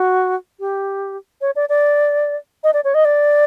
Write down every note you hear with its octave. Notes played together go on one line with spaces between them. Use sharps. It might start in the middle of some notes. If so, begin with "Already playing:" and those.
Already playing: F#4
G4
C#5
D5
D5
D#5
D5
C#5
D#5
D5